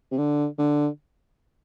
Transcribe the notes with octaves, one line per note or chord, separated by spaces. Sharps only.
C3
D3
D3